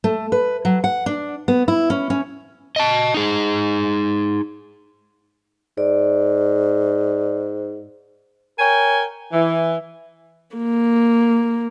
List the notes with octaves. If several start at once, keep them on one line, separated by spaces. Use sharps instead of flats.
A3
B4
F#3
F#5
D4
B3
E4
C#4
C#4
D#5 A5
D#4 G#4
G#2 D5
A#4 C#5 G5 G#5
E3
A#3